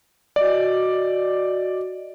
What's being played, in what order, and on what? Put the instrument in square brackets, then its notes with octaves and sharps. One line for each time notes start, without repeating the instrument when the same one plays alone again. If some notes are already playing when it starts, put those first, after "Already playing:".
[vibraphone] F#4 D#5 [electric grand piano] D5